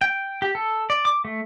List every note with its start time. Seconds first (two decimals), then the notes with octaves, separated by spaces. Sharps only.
0.01 G5
0.42 G4
0.55 A4
0.90 D5
1.05 D6
1.25 A3